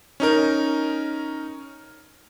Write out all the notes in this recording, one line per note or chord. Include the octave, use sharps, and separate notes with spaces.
C#4 D#4 A#4